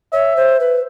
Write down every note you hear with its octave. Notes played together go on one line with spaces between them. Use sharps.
C#5 E5
C5
B4